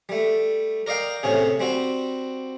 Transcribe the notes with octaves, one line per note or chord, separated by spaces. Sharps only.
G3 A3
A#4 D5 D#5 F5 G5
A2 C3 C#4 G#4
G3 C4 F#4